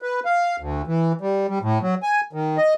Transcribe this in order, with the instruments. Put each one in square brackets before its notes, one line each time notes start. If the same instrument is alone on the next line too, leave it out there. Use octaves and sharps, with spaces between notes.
[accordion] B4
F5
D2
E3
G3
G3
A2
F#3
G#5
D#3
D#5